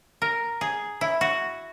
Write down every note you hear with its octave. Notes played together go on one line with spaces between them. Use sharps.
A#4
G#4
E4
F#4